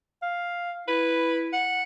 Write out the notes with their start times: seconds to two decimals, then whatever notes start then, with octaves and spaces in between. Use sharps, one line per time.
0.22 F5
0.88 E4 B4
1.53 F#5